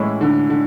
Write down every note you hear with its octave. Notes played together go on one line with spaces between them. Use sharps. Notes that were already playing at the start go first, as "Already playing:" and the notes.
Already playing: A2 E3 G#3 C#4 E4
D3
D3